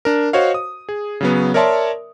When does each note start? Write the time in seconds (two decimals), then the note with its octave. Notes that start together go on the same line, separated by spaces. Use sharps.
0.05 D4 A#4
0.33 F#4 C5 C#5 D#5 F5
0.54 D#6
0.89 G#4
1.21 C#3 F#3 B3
1.54 A#4 C#5 D5 E5 A5 C6